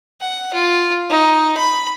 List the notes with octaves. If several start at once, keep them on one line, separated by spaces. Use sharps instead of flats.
F#5
F4
D#4
B5